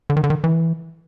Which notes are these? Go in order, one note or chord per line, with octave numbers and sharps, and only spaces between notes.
D3
D#3
D3
D#3
E3